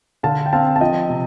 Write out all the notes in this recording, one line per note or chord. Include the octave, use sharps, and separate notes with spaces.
D3 F5 A5
G5
C4 F5 A5
A5
F3 D#5 G5
C3